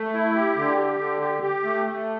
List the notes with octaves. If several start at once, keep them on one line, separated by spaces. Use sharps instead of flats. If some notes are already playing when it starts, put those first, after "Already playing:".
Already playing: A3
E4
G4
D3
G4
D3
G4
G4
A3
A3